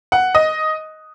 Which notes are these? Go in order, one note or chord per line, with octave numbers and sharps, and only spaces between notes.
F#5
D#5